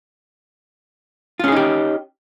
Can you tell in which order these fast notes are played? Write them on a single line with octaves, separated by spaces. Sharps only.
F4 C#4 G#4 D#4 G4